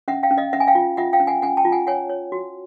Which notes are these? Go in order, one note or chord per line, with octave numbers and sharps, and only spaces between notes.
C#4 E5 F#5
F5 G5
C#4
D#5 F5
C#4 E5 F#5
G#5
F5 G5
F4
F4 E5 F#5
F5 G5
C#4
F#5 G#5
C#4 F#5 G#5
G5 A5
F4
F#5 G#5
C#5 F#5 G#5
C#5
F#4